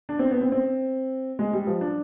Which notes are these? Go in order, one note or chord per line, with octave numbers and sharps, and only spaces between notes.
D4
C4
B3
C4
C4
G#3
G3
F3
D4